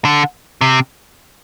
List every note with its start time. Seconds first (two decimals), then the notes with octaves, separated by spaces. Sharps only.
0.05 D3
0.61 C3